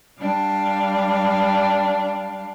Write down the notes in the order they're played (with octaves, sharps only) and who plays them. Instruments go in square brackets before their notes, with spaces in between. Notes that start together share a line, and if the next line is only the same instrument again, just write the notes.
[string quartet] G3 D4 F5